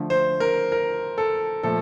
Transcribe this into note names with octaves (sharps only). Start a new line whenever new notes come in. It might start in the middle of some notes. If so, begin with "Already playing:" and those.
Already playing: D3 F3 A3
C5
A#4
A#4
A4
A#2 F3 A3 A4